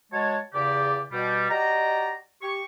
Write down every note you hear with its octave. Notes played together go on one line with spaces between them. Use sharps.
F#3 G#3 C#5 A5
E2 C#3 G4 D5
B2 G3
F#4 G4 D5 D#5 G5 A#5
G4 C#6